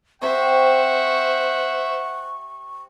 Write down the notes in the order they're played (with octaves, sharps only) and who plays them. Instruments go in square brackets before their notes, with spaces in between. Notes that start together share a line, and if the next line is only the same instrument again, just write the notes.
[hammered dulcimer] C4 G4 [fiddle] C5 E5 [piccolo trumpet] F#5 [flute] C#6